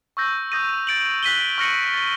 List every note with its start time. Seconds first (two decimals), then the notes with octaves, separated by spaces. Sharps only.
0.17 C#6 E6 G6 A#6
0.52 D#6 G6 A#6 D#7
0.87 A6 D7 F#7
1.23 F#6 B6 D#7 G7
1.58 C#6 F6 A#6 C#7 F#7
1.94 A6 D7 G7